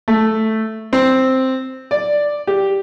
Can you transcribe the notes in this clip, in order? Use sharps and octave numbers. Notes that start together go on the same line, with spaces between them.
A3
C4
D5
G4